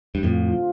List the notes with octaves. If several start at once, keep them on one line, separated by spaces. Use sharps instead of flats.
G2
F2 A2 D3 A3 C4 F4